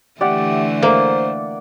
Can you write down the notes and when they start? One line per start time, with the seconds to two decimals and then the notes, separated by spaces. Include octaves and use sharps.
0.21 D3 E3 A3 G4 D5 F#5
0.82 A#3 C5